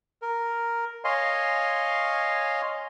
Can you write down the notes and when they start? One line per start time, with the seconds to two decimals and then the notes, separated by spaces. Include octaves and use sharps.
0.22 A#4
1.04 C#5 D#5 F5 G#5 C6